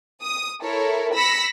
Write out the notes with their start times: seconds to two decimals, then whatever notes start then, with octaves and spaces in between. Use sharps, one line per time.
0.22 D#6
0.63 E4 A4 A#4 C#5
1.15 B5 E6 A#6 B6 C#7